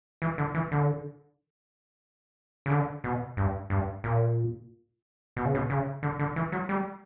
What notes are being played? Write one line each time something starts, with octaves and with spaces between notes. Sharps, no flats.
E3
D3
E3
D3
C#3
D3
B2
G2
G2
A#2
B2
C#3
B2
C#3
D3
D3
E3
F#3
G3